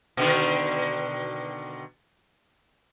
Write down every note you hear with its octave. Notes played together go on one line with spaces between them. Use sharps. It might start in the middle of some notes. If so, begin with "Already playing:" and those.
B2 D3 D#3